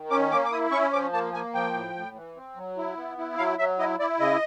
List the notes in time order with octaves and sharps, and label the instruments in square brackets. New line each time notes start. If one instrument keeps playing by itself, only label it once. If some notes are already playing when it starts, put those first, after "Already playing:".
Already playing: [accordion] D#3
C#4 D6
A#3 D6
D6
E4 D#6
C#4 C#6
F3 D6
A#3 A5
A#3 G#5
F3 G5
A2
A2
E3
C4
F#3
E4
B3
E4
F#3 F5
F#3 E5
E4 D#5
E4 D5
C#3 D#5